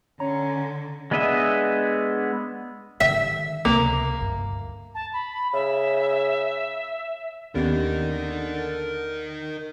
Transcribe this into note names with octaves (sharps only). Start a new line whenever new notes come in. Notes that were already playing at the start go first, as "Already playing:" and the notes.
D3 C#4 C#5 A#5
G#3 B3 D4 D#5 E5
D3 D#3 E5
C#2 C3 A#3
D2 G2
A5
B5
C#3 E5
D#2 D3 B3 C#4 G4 A#4 D#5